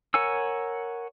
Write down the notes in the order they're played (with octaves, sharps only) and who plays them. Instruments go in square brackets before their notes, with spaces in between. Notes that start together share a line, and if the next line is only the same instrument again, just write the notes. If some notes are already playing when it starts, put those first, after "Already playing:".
[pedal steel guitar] A#4 C#5 F#5 G#5 E6